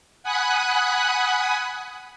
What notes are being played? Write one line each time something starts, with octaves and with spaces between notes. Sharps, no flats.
F#5 G#5 B5 D#6 F#6